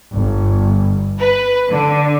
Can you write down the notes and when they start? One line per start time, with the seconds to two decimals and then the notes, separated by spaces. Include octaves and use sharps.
0.14 G1
1.20 B4
1.70 D3